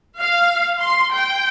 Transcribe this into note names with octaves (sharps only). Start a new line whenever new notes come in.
F5
C6
G5